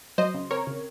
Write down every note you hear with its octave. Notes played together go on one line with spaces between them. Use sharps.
F#3 C5 D#5
C#3
C4 A#4 C#5
C#3